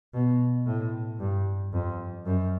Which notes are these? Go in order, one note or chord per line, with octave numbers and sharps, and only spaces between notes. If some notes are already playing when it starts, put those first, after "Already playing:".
B2
A2
G2
F2
F#2